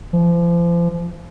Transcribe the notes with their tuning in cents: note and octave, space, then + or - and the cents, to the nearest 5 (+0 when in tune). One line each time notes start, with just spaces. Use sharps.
F3 -35